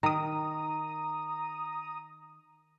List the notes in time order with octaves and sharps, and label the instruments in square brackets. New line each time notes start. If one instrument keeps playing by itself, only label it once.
[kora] D#3 [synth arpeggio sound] A#5 D#6